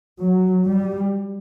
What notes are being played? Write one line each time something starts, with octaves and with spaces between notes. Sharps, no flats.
F#3
G3